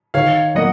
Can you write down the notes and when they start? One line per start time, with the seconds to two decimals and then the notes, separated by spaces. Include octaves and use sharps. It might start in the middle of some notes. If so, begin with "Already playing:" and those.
0.14 D#3 C#5 F5
0.55 F#3 A#3 D#5 F#5